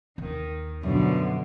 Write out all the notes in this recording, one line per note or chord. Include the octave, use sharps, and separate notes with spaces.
D#2 D#3
F#2 B2 D3 F3